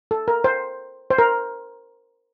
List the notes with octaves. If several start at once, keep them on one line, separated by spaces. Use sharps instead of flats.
A4
A#4
C5
C5
A#4